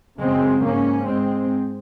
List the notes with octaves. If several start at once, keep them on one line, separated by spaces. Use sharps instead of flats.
F#2 C#3 G#3 C4
G#2 A#3 C#4
G#2 G#3 C4